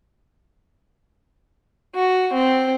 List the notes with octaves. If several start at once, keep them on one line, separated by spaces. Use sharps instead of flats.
F#4
C4